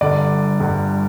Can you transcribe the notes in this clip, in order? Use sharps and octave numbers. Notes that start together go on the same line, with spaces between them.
G1 G2 D3 D5
G1 G2 D3